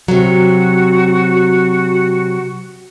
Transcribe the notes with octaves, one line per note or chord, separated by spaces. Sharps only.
C3 F#3 F#4